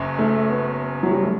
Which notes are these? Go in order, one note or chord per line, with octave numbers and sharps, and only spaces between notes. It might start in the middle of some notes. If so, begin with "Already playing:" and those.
Already playing: F#1 F#2
A3
B3
F#3
G3
A3